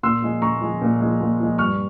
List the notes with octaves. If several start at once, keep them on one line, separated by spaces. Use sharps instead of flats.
A#2 C6 E6
F3 G#3
A#2 A#5 C#6
F3 G#3
A#2
F3 G#3
A#2
F3 G#3
G2 C#6 F6